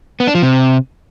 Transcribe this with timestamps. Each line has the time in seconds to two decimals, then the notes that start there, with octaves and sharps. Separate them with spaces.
0.20 B3
0.27 D4
0.35 F3
0.42 C3